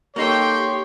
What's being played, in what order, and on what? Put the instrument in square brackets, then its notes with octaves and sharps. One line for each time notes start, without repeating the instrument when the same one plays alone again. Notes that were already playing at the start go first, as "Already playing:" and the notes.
[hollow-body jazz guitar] A#3 D#4 A4 [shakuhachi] G4 [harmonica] C#5 [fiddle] G5 C6